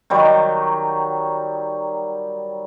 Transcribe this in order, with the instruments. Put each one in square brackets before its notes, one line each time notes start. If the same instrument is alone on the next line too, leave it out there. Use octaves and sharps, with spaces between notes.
[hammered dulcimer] D#3 F#3 G3